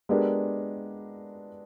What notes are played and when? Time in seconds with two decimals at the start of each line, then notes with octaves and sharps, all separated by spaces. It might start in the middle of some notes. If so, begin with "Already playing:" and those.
0.09 G#3 B3 D4 G4 A#4